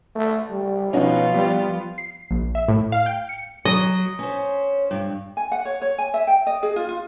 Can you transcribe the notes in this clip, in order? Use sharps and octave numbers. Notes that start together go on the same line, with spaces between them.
A3
G3
B2 F3 C#4 D#4 F4 F#4
G3 B3
C7
A#1
E5
A2
F5
G5
C#7
F#3 D#5
C#4 C5
G2
G#5
F#5
C#5
C#5
G#5
E5
G5
D#5
G#4
F4
F4